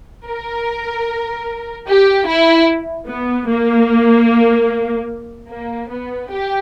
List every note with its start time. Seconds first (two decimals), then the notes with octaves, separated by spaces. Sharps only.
0.27 A#4
1.88 G4
2.27 E4
3.08 B3
3.49 A#3
5.50 A#3
5.90 B3
6.30 G4